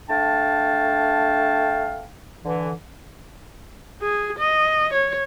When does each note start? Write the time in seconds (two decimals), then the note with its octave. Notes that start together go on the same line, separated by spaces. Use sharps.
0.09 A3 D4 F5 G5 A5
2.44 D3 E3
4.02 G#4
4.39 D#5
4.93 C#5